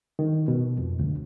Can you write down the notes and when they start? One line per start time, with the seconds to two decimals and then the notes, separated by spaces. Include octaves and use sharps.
0.19 D#3
0.48 B2
0.78 F2
0.99 D2